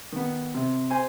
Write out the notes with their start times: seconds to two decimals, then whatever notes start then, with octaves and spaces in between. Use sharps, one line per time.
0.12 D#3 B3
0.54 C3
0.90 C5 G#5